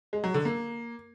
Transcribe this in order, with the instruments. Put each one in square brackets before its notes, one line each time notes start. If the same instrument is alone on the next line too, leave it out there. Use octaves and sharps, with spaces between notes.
[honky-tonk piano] G#3
F#3
D3
A#3